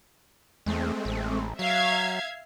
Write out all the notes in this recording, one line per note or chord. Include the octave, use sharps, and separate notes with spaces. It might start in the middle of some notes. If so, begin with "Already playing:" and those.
E2 G#3 A3 C4
A1
F#3 E5 F5 G#6 C7